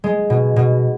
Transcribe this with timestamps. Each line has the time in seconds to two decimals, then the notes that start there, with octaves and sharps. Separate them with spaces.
0.04 G#3
0.30 B2
0.56 B2